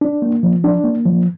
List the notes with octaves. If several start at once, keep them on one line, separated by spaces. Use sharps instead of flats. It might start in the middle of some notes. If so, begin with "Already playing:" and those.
D4
A#3
F3
D4
A#3
F3